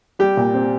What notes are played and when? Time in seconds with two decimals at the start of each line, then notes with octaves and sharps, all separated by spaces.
0.19 G3 G4
0.37 A#2
0.54 C4